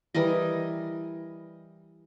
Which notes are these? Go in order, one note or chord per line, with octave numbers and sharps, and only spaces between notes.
E3 G3 A#4 D#5